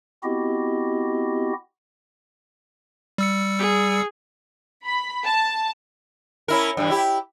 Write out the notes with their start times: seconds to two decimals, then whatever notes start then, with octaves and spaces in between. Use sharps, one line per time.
0.23 B3 C4 E4 F#4 G4 D#5
3.18 G3 E6 C#7
3.59 G#4
4.85 B5
5.25 A5
6.48 C#4 E4 A#4
6.77 G2 E3
6.90 E4 G4